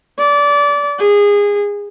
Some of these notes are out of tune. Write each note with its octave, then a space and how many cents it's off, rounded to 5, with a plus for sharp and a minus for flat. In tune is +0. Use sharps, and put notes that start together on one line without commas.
D5 -25
G#4 -20